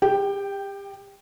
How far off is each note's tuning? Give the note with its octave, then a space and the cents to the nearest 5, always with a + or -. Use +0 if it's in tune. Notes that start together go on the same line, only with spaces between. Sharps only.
G4 +30 G5 +0